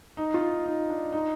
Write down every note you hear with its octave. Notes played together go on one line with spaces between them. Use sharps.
D#4
F4
D#4
D4
D#4